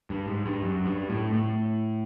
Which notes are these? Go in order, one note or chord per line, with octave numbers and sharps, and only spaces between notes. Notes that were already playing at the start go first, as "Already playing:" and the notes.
G2
G#2
G2
F#2
G2
A2
A2